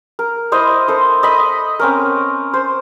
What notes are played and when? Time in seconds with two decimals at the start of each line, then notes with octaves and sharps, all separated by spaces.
0.19 A#4
0.52 E4 C5 D#5
0.88 A4 A#4 C5
1.23 D#5 B5
1.80 C4 C#4 A#4
2.54 C5